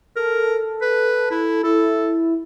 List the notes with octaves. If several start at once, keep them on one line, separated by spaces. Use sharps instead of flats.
A4 A#4
B4
E4
E4 A4